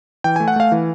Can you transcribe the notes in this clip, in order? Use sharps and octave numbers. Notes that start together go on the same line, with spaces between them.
E3 G5
A3 G#5
F#5
A3 F5
E3